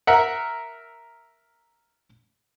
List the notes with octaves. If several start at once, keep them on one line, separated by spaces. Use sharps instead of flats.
A#4 E5 F#5